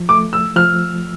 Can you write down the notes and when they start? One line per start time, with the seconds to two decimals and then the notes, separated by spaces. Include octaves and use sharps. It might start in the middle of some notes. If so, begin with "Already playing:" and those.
Already playing: F3
0.09 A3 D6
0.33 E6
0.56 F3 F6